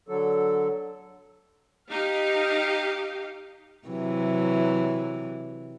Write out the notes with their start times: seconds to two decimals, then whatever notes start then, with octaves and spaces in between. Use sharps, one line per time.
0.08 D3 F#3 A4
1.90 D#4 G4 F5
3.88 C3 E3 F#3